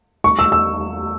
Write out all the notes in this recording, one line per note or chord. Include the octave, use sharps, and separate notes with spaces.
C#6
E6
E6